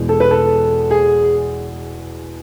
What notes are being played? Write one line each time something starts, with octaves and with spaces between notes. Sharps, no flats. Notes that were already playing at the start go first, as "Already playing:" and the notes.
Already playing: E2 B2 G#3
A4
B4
A4
G#4